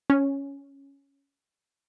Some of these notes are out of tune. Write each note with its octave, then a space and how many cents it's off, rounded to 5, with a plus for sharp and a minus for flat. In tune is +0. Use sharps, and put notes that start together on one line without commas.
C#4 +0